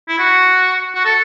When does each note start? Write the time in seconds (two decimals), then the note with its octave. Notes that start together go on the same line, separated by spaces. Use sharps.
0.09 E4
0.19 F#4
0.95 F#4
1.05 A4